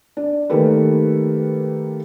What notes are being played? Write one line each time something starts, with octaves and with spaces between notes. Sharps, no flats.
D4
D#3 A3 A#3 G4 A4 B4